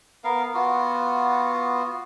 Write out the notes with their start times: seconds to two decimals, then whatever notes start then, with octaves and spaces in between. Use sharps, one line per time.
0.24 B3 A#4 F5
0.54 B3 F4 F#4